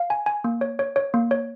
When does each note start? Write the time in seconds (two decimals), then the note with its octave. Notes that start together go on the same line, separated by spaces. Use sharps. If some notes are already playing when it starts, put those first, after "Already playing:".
Already playing: F5
0.10 G#5
0.26 G#5
0.44 A#3
0.61 C#5
0.79 C#5
0.96 C#5
1.14 A#3
1.31 C#5